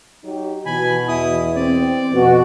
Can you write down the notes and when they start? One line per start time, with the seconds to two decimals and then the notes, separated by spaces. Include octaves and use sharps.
0.24 F#3 D#4 G4
0.66 B2 E3 G#5 B5
1.08 E2 E4 D#6
1.55 C4 D5
2.12 F2 B2 F#4